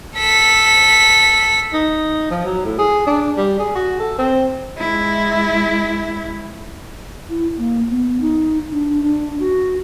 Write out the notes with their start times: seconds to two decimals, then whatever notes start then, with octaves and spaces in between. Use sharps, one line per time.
0.18 A4 B6
1.73 D#4
2.31 F3
2.45 F#3
2.65 A2
2.78 G#4
3.07 D4
3.37 G3
3.59 G#4
3.75 F#4
3.99 A4
4.18 C4
4.77 G#3 E4
7.29 E4
7.58 A#3
7.90 B3
8.21 D#4
8.71 D4
9.03 D4
9.40 F#4